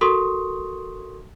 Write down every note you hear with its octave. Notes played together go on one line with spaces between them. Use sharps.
F#4 A4 A#4 C6 C#6 D#6